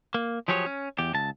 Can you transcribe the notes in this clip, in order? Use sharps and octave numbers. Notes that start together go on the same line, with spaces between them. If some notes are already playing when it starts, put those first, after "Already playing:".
A#3
F3 F#3 G4 G#4 C#5
C#4
E2 G4
C#2 A5